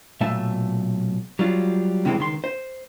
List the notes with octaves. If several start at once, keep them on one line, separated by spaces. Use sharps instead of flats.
B1 A#2 A3 E5 A5
F#3 G3 F4
C#2 C3 E3 G3 G#3 C4
C#2 D#3 C6
C5